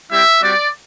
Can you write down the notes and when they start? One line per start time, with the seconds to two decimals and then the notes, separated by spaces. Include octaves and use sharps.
0.11 G3 C4 E4 G4 E5
0.42 G3 C4 F#4 D5